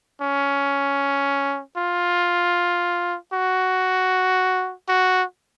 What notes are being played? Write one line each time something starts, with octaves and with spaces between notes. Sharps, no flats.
C#4
F4
F#4
F#4